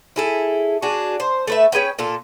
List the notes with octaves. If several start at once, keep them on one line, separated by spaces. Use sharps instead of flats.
E4 G#4 A4
D4 F#4 G#4
C5
A3 B4 E5
C#4 G#4 B4 G5
A#2 F4 A4